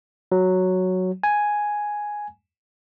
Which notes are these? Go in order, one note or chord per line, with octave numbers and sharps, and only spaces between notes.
F#3
G#5